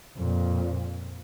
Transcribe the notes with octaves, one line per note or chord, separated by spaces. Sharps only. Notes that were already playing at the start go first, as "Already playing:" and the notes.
F2 A#2